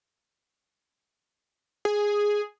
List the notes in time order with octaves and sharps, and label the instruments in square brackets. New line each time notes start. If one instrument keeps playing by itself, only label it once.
[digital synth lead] G#4